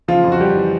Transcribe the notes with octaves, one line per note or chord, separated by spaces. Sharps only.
C#3 F3 F4
F2
F#4
F2 G3 G4
E3